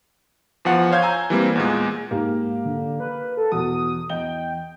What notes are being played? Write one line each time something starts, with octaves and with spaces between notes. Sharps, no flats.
E2 F3 F#5
C5 C#5 F5 G6 G#6
G#5 A#5 E6
E3 G3 A#3 C4
E2 A#2 G#3
G#2 A#3 G4 A#4
D3
B4
A4
E2 B2 D#6
E2 D#5 G5 G7